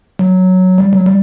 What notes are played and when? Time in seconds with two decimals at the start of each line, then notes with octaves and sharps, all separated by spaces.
0.19 F#3
0.78 G3
0.93 F#3
1.06 G3